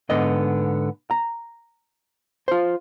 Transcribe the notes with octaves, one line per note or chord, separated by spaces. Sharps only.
G#2 D3 B3 D#5
A#5
F4 C5